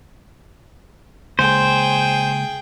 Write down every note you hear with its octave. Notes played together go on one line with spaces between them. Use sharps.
C#3 G#3 A#3 G#4 C5 G5